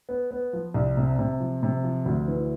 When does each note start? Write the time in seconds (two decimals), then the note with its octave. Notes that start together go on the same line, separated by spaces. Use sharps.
0.09 B3
0.31 B3
0.53 F3
0.74 C2
0.97 C3
1.19 C3
1.40 F3
1.63 C3
1.84 F3
2.06 D2
2.28 E3